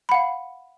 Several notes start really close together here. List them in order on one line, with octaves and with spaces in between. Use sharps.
B5 F#5 F5